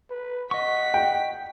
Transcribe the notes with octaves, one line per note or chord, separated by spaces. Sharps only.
B4
D#5 F#5 C#6 B6
G5